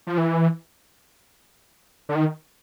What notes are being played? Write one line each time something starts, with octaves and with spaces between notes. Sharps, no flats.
F3
E3
D3
D#3